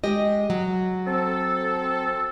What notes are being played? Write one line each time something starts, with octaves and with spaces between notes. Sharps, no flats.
G#3 G4 D#5
F#3
C4 A4